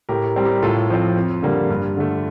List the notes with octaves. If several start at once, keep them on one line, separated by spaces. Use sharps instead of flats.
A2 G4 A#4
G3 C4
G4 A#4
A2 F4 A4
F3 C4
F2
D3 G3 A#3
G2
D3 A3